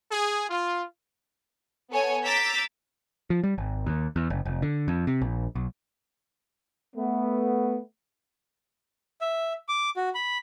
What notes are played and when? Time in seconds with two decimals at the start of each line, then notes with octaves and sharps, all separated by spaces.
0.11 G#4
0.49 F4
1.91 B3 A4 C#5 G#5
2.24 A#5 D6 E6 G6 A6 B6
3.30 F3
3.44 G3
3.58 G#1
3.86 D#2
4.16 E2
4.30 F#1
4.45 F1
4.62 D3
4.88 F2
5.07 C3
5.22 A#1
5.55 B1
6.96 A3 B3
9.21 E5
9.68 D6
9.96 F#4
10.15 B5